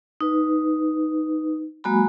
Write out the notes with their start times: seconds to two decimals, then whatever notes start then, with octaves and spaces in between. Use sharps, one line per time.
0.21 D#4 B4
1.84 F#3 G#3 A#3 F#4 G#5 B5